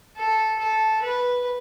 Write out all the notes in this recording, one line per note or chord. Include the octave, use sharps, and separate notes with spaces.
A4
A4
B4